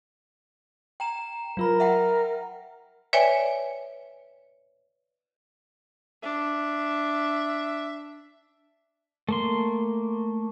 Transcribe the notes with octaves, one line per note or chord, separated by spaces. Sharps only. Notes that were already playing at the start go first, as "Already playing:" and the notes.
G5 A#5 E7
F#3 F4 A#4 B5
E5 F#5 G5
B4 C#5 D5 E5 G5 G#5
D4 E5
A3 A#3 C6